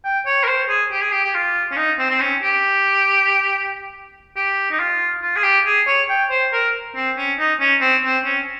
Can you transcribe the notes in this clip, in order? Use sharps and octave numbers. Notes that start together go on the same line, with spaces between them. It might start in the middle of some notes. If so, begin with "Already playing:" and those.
G5
C#5
A#4
C5
G#4
G4
G#4
G4
G4
F4
C#4
D#4
C4
C4
C#4
G4
G4
D#4
F4
F4
G#4
G4
G#4
C#5
G5
C5
A#4
C4
C#4
D#4
C#4
C4
C4
C#4